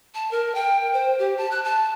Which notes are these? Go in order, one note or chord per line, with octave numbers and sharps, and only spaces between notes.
A5
A#4
G5
C5
G4
A5
F#6
A5